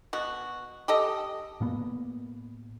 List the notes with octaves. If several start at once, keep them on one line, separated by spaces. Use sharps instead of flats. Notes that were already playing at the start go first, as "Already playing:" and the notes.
B2 F#4
G4 A4 D#5
A2 A#3 B3